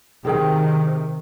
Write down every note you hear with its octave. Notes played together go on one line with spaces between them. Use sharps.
C3 D#3 G4 G#4 G5